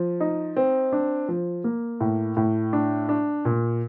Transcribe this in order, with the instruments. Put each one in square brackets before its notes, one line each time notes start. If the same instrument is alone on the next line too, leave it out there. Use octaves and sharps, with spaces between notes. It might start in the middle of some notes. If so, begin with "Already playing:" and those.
Already playing: [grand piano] F3
D#4
C4
D4
F3
A#3
A2
A2
D4
D4
A#2